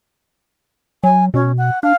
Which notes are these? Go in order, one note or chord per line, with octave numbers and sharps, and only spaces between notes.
F#3 G#5
B2 C#4
F#5
D4 F5